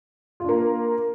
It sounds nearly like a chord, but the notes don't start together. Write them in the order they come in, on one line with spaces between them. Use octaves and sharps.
F4 D4 A#3